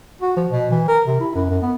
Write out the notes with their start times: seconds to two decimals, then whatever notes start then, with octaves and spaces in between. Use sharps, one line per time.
0.21 F#4
0.37 F3
0.51 B2
0.71 E3
0.88 A#4
1.06 C3
1.20 E4
1.35 F#2
1.50 F#2
1.62 B3